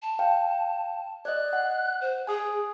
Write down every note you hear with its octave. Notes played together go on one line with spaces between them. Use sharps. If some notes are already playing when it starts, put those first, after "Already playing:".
A5
F5 G5
D5 D#5 F#6
F#5
C5
G#4 G#5 D#6